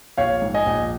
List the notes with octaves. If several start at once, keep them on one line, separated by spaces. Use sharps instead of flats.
A#1 C#5 F5
G#2
D#5 G#5
A#1